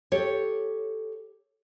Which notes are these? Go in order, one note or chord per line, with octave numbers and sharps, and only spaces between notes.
G4 A4 C#5